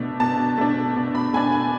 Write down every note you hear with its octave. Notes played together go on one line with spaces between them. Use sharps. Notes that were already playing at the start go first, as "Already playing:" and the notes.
Already playing: B2 A3 D4
B2 A5
A3 D4
B2
B5
A3 D4 G#5
G#5